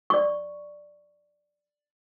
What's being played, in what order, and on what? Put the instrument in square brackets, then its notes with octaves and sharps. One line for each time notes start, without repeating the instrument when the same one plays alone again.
[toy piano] D5 C#6